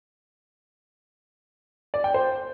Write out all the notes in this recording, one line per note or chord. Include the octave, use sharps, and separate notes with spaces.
D5
G5
C5